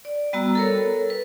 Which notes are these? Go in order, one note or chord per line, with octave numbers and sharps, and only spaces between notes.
D5
G3 B3 F#4 A#5 E6
A4 A#4 C#5
B4